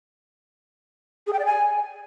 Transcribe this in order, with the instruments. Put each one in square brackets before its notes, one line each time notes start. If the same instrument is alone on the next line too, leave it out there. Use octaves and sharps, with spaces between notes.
[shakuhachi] G#4
G5
D5
G#5